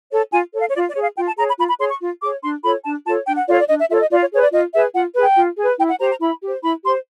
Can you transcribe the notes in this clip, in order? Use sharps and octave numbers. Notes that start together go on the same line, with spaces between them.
A4 C#5
F4 G#5
A4 C#5
F5
C#5
F4 D5
D5
G#4 C#5
F5
F4 G5
A5
G#4 C#5 A#5
B5
F4 B5
B5
G#4 C#5 C6
C#6
F4
G#4 C#5 D6
D4 C6
F4 A4 C#5 B5
D4 A5
F4 A4 C#5 A5
D4 G5
F#5
F4 A4 C#5 D5
D5
D4 D#5
E5
F4 A4 C#5 E5
D#5
F4 D5
C#5
G#4 B4 C#5
D5
F4 D#5
G#4 B4 E5
F4 F#5
G#4 B4
G5
F4
G#4 B4
E4 G5
F#5
G4 C5 A#5
A#5
E4 B5
G4 C5
E4 B5
G4 C5 C6